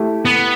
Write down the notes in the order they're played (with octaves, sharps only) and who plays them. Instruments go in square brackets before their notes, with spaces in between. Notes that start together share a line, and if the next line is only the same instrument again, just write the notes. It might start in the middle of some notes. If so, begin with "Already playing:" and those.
Already playing: [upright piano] A3 E4 G4
[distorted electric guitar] B3